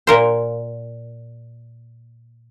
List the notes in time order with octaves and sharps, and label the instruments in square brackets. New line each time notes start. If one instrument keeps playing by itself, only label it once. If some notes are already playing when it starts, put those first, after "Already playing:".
[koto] A#2 A#4 C5